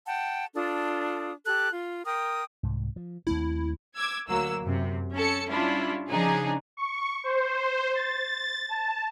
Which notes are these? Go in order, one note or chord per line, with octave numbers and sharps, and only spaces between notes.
F#5 G5 A5
D4 F4 A4 D#6
G4 A4 F#6
F4
A#4 G5 D#6
C2 G#2
F3
D#2 A3 C4 E4
D6 E6 G#6
D2 F#3 A#3 E6
F#2 C3
C#4 A4 C#7
G3 C#4 D4 E4 F4
C#3 F3 D4 D#4 G#4
C#6
C5
A6
A5